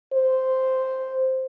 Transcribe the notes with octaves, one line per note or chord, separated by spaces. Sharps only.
C5